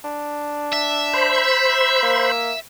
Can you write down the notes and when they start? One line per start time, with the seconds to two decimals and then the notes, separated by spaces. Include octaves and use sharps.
0.04 D4
0.72 E5
1.14 C5 B5
2.02 A#3